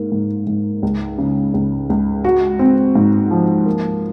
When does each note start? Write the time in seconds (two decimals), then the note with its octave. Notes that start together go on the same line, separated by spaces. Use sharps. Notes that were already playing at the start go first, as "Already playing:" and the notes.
Already playing: G#2 A#3
0.12 G#2
0.47 G#2
0.83 C#2
1.19 C#3
1.54 C#2
1.90 C#2
2.25 F#4
2.59 C4
2.95 G#2
3.31 F3
3.66 A#3